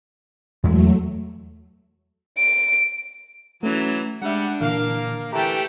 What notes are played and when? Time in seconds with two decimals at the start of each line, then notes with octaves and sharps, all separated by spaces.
0.64 E2 F#3 G#3 A3
2.38 D7
3.63 E3 F#3 A3 C#4
4.22 G3 G#3 D4 E5 F#5
4.61 A#2 D3 E3 A#3 F5
5.33 D3 E3 A3 G4 G5 A5 A#5